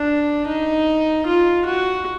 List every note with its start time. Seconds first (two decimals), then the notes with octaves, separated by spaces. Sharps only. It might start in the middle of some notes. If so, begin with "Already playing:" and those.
Already playing: D4
0.47 D#4
1.26 F4
1.65 F#4